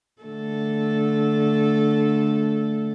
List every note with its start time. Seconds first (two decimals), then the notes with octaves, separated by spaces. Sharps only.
0.22 D3 A3 A4